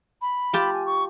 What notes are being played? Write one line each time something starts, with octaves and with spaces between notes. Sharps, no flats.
B5
F4 G4 A5
G#5
C#6